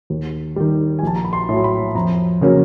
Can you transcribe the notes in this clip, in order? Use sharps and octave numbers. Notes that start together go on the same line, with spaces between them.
D#2
D#3 G3
G#5
A#1 A5
A#5
B5
C6
A2 F#3
B5
F2 A#5
C#3 F#3 A#3 C#4